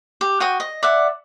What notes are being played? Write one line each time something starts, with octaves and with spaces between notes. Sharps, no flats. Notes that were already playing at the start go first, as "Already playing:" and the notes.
G4
F#4 G5 D#6
D#5
D5 E5 F#5